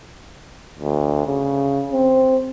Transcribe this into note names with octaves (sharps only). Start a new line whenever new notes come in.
D2
C#3
C4